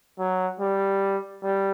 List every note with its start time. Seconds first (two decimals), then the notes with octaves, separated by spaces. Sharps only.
0.19 F#3
0.60 G3
1.43 G3